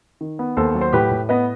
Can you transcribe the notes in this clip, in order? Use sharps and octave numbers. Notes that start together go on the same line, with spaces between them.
D#3
B3
D#2 A4 C5
F#3
C5
A2 G4 B4
A2
B3 B4 D#5